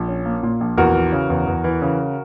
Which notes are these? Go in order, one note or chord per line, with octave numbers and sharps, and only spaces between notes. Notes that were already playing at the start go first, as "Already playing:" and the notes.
Already playing: A#1
C#4
A#3
A#2
A#1
E2 F#4 A#4
E3
C#3
E2
E2
E3
C#3